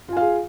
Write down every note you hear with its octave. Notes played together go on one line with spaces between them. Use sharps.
F4 G#4 F5 G#5